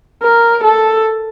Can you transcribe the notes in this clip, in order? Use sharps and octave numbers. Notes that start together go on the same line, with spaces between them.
A#4
A4